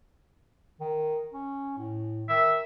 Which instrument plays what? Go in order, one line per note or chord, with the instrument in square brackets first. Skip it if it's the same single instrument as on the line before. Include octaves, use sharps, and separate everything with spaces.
[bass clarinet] D#3
C#4
A2
[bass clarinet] D#3 [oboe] E5